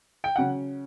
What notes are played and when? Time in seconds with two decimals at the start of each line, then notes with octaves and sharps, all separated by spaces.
0.24 G5
0.36 C#3 F#3 C#4 F#5